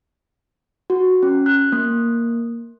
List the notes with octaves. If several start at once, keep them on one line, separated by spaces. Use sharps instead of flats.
F#4
C#4
F#6
A#3